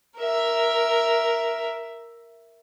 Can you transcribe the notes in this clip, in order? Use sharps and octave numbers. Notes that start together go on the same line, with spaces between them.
A#4 E5